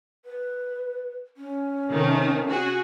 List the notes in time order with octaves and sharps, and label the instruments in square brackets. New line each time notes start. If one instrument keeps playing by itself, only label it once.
[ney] B4
C#4
[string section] C3 D#3 A3
F#4 G#4